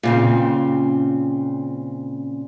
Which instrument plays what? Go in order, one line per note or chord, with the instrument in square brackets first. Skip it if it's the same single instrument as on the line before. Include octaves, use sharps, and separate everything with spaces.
[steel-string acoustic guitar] A#2 C#3 C4